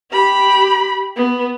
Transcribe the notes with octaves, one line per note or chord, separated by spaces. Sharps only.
G4 B5
B3